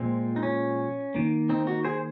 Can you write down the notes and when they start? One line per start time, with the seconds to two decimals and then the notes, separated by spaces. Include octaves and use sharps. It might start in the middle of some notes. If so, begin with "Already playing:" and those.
Already playing: A#2 F3 G#3 C4
0.36 D#4
0.43 C#4
1.15 D#3 A#3
1.49 C4 D#4
1.67 D#4 F#4
1.85 G#4 C5